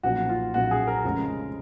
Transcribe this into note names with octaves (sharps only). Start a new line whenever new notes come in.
B1 A#2 F3 A#3 F#4
F4
B1 A#2 F3 A#3 F#4
G#4
A#4
F1 F2 C#3 G#3 C#4